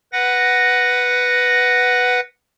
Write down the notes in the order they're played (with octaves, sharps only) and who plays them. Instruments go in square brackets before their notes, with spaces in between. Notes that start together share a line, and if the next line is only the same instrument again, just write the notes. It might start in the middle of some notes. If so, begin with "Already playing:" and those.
[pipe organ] B4 F#5 A#6